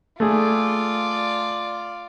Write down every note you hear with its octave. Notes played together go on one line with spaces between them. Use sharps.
A3 F4 G#4 D5